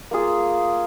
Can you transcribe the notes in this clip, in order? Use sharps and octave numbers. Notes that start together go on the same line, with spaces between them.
A#3 F4 G#4